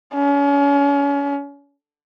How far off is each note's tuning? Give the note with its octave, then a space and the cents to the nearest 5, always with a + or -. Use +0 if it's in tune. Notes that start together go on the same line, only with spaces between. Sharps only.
C#4 +35